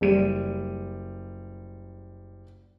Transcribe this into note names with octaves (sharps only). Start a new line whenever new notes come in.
F#1 G3 D#7